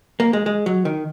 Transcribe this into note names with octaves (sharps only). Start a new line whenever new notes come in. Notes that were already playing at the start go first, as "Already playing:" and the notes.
A#3
G#3
G#3
F#3
D#3